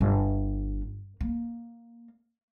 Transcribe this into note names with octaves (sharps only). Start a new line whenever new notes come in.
G1
A#3